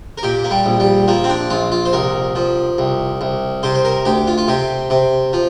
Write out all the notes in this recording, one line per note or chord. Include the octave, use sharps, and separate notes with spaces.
A#4
A#2 G4
A#3
G3
A#1
G3
F3 A#3
C4
D4
A#1 F4
F4
C5
C2 A#4
F3
C2
C2
C3 C5
C5
A#4
D2 G4
F4
F4
C3 G4
C3
F3